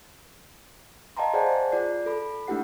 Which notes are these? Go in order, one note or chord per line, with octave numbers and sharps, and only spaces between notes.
D#5 F5 G5 A5 A#5 C6
G#4 C5 D5 F#5 G#5 A5
F4 D5 C7
A4 B5
A3 D4 E4 G4 F#5 C7